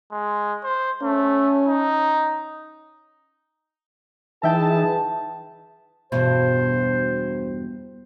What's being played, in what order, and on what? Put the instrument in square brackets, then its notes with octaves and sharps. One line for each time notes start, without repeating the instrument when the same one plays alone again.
[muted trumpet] G#3
C5
[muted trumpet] A3 [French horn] C#4
[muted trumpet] D#4
[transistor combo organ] E3 D#4 [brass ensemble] G#4 B4 A5 [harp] E5 G5
[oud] E2 G2 B2 [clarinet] C5